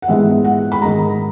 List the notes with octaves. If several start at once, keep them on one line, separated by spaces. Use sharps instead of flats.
F#5
A#1 G#2 E3 G#3 B3 E5
F#5
B5
G#2 D#3 G#3 A#5